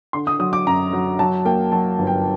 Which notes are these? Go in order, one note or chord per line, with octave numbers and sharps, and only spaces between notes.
D3 C6
D#6
F#3 D#6
D6
F#2 A#5
F#3
F#3 A5
A#3 G5
F#3 A5
G1
G5